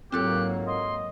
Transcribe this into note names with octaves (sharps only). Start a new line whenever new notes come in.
G#2 F#3 A#3 C4 F4 G4 A4 F#6
D#5 C6